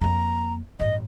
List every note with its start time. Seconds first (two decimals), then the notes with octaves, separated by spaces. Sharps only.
0.01 F2 A#3 A#5
0.80 A1 G2 D#5